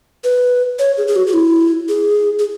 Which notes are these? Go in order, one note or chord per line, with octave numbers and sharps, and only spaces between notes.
B4
C#5
G#4
G#4
F#4
F#4
E4
G#4
G#4